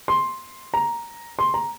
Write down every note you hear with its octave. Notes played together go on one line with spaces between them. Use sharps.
C6
A#5
C6
A#5